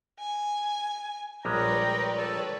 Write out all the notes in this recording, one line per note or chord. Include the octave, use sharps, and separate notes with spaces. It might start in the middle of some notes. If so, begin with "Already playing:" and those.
G#5
A#1 G3 G#3 B4 C#5 D5 G5 A#5
A4